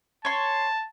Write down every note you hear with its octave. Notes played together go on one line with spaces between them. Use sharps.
C#5 A5 C6